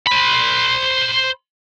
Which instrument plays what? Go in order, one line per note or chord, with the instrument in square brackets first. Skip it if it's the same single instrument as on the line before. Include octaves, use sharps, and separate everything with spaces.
[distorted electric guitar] C5 B5